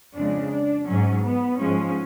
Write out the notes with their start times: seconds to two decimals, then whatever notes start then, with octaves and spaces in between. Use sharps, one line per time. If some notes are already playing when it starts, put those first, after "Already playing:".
0.14 F2 C#3 G#3 D4
0.51 D4
0.87 G#2 F#3 C#4
1.24 B3
1.59 G#2 F3 G#3 C#4